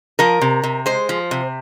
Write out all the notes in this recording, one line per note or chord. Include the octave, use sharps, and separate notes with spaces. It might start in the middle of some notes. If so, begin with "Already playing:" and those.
F3 A#4
C3
C3
G#3 C5
F3
C3